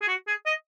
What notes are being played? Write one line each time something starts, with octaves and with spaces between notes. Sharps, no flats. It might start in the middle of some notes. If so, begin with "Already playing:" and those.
G#4
F#4
G#4
D#5